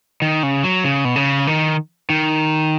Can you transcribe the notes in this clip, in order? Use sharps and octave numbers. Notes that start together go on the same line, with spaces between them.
D#3
C#3
F#3
C#3
B2
C#3
D#3
D#3